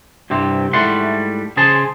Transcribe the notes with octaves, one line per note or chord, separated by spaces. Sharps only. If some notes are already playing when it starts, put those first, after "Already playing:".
C2 G2 C3 C4 G4
G#2 G3 A3 E4 F#5 C6
C#3 G#4 C5 A5 C6